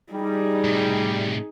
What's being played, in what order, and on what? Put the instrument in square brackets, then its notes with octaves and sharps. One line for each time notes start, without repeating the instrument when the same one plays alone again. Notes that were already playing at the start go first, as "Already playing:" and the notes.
[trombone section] G3 [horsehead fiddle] D#4 G#4
[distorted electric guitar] A2 C3